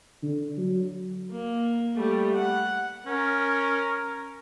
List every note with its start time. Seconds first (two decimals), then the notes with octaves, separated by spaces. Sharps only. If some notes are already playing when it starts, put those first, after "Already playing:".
0.23 D3
0.57 F#3
1.31 A#3
1.96 G3 A3
2.35 F#5
3.06 C#4 A#4